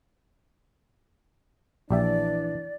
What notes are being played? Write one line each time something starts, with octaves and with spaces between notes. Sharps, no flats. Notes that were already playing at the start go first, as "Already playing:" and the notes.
A#1 E3 D4 G4 D5 E5